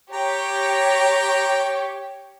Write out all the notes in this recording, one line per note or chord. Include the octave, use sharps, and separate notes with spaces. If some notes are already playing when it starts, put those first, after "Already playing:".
G4 C#5 G5 A#5